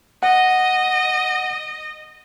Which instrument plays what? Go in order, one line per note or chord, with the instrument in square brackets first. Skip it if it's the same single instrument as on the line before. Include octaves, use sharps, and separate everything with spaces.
[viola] D#5 [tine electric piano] F#5